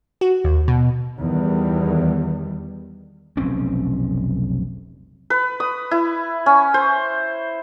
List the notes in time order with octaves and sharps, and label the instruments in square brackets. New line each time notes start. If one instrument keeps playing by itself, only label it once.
[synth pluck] F#4
D#2
B2
[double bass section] E2 D#3 G3
[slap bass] F1 B1 C4 C#4
[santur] B4
D#6
E4
C#4
C5